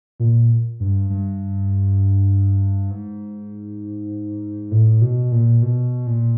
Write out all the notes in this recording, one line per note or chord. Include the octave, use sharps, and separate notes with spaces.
A#2
G2
G2
G#2
A2
B2
A#2
B2
A#2